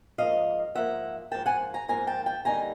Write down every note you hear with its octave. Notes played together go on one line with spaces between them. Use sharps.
G#2 F3 A#3 D#5 F5
G#2 F3 A#3 E5 F#5
G#2 F3 A#3 G5 A5
F#5 G#5
G#5 A#5
G#2 F3 A#3 G#5 A#5
G5 A5
G5 A5
D#2 D3 G3 A#3 D#4 G#5 A#5